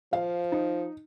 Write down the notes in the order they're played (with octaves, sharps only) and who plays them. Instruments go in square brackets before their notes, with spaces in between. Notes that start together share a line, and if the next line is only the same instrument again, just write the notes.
[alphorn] F3 [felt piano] F5
[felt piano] D#4